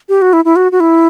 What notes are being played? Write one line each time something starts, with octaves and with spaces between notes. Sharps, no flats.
G4
F#4
E4
E4
F#4
F#4
E4